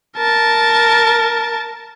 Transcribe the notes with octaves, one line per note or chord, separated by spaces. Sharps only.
A#4 A5